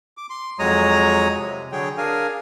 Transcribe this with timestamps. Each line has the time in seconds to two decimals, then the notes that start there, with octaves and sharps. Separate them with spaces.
0.17 D6
0.30 C6
0.59 F2 F#3 G#3 C#5 A#5 D#6
1.38 C3
1.72 D3 F#3 G#4 C#5 G5
1.98 D4 G#4 A#4 F5 G#5